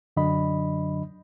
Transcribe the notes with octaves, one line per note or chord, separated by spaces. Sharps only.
F#2 D3 F#3 D4 D#5 B5